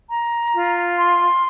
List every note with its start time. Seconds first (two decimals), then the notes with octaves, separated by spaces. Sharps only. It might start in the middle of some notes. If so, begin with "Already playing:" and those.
0.09 A#5
0.53 F4
0.99 C6